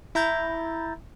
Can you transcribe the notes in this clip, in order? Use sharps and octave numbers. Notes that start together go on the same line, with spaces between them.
E4 A#5 G6 A6